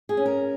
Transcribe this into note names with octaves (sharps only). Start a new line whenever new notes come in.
G#4
C#4
A#4